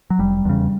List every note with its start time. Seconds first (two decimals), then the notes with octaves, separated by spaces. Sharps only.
0.10 F#3
0.19 F1 G3
0.45 E2 C#3